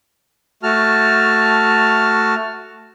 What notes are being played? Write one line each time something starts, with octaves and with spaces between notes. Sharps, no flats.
A3 F#4 A5 F6